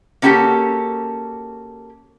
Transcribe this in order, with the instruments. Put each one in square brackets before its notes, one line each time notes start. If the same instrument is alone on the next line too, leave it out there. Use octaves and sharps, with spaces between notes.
[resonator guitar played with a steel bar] A#3 C#4 F#4 G4 A4